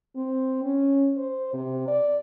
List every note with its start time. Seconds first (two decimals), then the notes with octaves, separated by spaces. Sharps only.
0.16 C4
0.64 C#4
1.17 C5
1.53 C3
1.88 D5